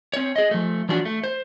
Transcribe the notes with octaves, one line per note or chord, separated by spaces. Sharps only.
C4 C#5
G#4 D#5
F3 A3
E3 F3 C#4 D4 F#4
A3
C5